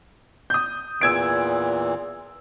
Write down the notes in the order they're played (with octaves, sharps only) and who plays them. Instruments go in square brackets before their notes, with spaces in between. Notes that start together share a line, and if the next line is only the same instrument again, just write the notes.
[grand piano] D#6 G6
[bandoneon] E2 A#2 E3 [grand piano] E6 G#6 D7